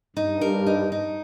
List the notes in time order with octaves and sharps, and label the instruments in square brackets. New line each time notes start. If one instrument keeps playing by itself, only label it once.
[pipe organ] G2 [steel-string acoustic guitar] D#4
[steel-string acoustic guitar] A#4
D#4
D#4